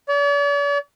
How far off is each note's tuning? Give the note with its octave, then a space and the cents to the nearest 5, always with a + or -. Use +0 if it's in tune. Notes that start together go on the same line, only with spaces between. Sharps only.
D5 -45